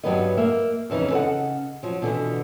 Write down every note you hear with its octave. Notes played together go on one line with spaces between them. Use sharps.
G2 F#3 G3 B3 B4 D#5
A#3 E5
F2 C#3 E3 D#4
C#3 A4 C5 D#5 F#5
F3 F#3
B2 D3 E3